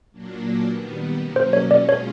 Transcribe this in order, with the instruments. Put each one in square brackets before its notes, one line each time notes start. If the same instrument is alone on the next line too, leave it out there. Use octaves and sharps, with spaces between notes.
[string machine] A#2 F#3 A#3 D4
D#3 G3 B3
B2 F#3 A#3 C#4
[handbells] C5
C#5
[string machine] B2 G#3 C#4 F4 [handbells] D5
[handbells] C#5